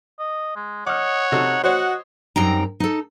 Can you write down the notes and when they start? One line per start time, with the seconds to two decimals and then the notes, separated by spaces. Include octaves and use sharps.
0.19 D#5
0.56 G#3
0.87 C#5 D#5 F#5 D6 F6
1.32 C3 D#4 F#4 A4
1.64 F#4 C5 C#5 D#5 F#5
2.36 F#2 G3 C4 D#4 G5 A#5
2.80 D#4 A4